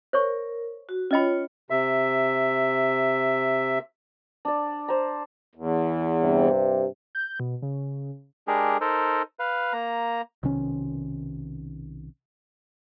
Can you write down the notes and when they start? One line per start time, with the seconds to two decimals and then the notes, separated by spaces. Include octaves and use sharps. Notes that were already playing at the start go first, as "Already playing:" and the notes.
0.13 A#4 C5 C#5 C#6
0.89 F#4
1.11 C#4 F4 C#5 D#5 B5
1.70 C3 E5
4.45 D4 D5
4.88 C5 A#5
5.55 E2
6.22 G2 C3
7.15 G6
7.40 B2
7.62 C#3
8.48 G#3 D4 G4 G#4 A#4
8.81 D#4 A4 A#4 C5
9.39 B4 F5
9.73 A#3 A#5
10.43 B1 C3 D#3 C#4